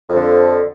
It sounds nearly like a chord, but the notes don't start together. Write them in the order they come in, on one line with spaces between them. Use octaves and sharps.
F2 F3 D3